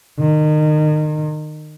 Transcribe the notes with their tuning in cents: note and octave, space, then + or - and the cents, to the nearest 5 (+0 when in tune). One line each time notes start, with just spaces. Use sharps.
D#3 -30